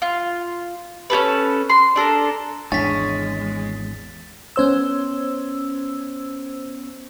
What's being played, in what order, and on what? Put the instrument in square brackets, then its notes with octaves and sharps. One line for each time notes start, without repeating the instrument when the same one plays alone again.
[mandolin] F4
C#4 G4 A4 B4
C6
D4 A4 A#4
[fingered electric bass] G#1 E2 D4 [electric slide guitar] G#3 [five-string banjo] C#4 [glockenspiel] A6 B6
[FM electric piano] B3 C#4 C5 E6